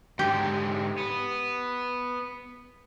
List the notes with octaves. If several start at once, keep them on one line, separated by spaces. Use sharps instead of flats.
G#2 D3 G4
B3